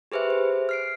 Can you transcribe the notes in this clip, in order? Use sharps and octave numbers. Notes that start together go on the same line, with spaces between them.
G4 G#4 B4 C5 E5
C5
F6 C7 D7